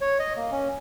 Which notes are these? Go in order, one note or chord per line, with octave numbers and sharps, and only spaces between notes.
C#5
D#5
A#3
C#4